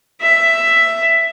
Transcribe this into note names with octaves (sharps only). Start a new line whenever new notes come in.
E5